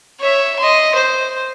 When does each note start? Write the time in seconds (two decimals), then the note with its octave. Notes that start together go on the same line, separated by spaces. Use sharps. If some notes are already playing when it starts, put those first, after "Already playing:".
0.20 C#5 E5
0.59 D#5 C6
0.95 C5